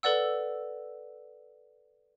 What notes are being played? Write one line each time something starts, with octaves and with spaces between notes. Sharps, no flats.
A4 B4 D5 F#5 E6